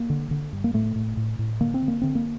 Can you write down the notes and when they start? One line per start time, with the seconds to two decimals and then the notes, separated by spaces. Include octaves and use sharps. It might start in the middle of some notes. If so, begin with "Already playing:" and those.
Already playing: A#3
0.10 D3
0.31 D3
0.53 G2
0.64 A#3
0.74 A2 A3
0.96 A2
1.17 A2
1.39 A2
1.60 D3 A#3
1.74 C4
1.82 D3
1.88 A#3
2.02 D3 C4
2.15 A#3